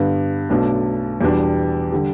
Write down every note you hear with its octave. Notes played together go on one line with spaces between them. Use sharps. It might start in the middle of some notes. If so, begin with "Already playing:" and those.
Already playing: G2 D3 B3
B1 B2 A3 D4
E2 B2 G3 D4
D3 G3